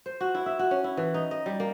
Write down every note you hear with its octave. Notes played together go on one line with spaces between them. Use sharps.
C5
F#4
E4
E5
F#4
C#4
E4
E3
D#4
D#5
G3
A#3